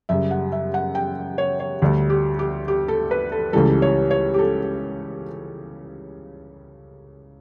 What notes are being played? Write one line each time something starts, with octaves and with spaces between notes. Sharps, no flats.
F#2 C#3 G3 E5
F#5
E5
F#5
G5
C#5
C#5
D2 D3 G3
G4
G4
G4
A4
B4
A4
C#2 C#3 E3 G3 A4
C#5
C#5
G4
A4